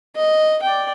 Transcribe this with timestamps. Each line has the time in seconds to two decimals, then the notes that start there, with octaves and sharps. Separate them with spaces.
0.16 D#5
0.62 D5 G5